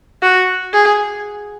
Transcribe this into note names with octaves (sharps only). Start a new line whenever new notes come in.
F#4
G#4